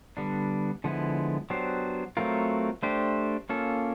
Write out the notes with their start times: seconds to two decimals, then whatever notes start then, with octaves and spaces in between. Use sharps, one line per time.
0.17 D3 G3 B3 D4
0.84 D3 F3 G#3 B3 E4
1.50 F#3 B3 D4 G4 C5
2.17 F#3 A3 C4 F4 A#4
2.83 A3 D4 G4 C5
3.49 A#3 C#4 F4 A4